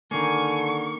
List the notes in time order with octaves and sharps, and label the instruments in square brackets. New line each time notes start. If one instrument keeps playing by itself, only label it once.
[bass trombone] D3 [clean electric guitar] D#3 A#3 [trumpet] G#5 [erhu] C#6